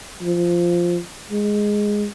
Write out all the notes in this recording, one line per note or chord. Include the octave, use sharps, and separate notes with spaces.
F3
G#3